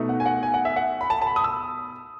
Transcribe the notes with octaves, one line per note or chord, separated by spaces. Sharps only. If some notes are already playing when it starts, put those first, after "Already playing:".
Already playing: B2 A3 D#4
F#5
G#5
F#5
G#5
F#5
E5
F#5
B5
A5
A5
B5
D#6
E6